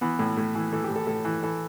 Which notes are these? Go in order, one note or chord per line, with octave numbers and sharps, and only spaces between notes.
E3 B3
A2
A2
E3
E3 A4
G4
A2
A4
A2 A4
E3
E3 A4